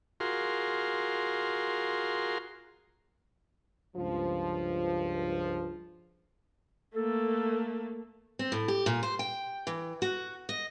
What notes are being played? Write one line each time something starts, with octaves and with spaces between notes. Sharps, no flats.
F4 F#4 G#4 A#4 C6
C#2 G2 F3
A3 A#3 A4
C4
A2
G4
A#2
C5
G5
E3
F#4
D#5